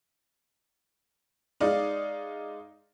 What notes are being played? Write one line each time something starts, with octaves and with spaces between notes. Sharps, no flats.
G#3 D#4 D5 F5